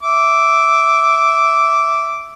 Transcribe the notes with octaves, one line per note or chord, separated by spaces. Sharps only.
E5 D6